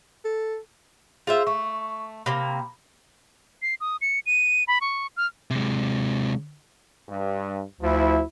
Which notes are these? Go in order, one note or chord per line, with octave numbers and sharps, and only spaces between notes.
A4
F4 G#4 C5 E5
A3 C#6
C3 A#3 B5
C7
D#6
C#7
D#7
B5
C#6
F6
C3 G#3
G2
D2 F3 E4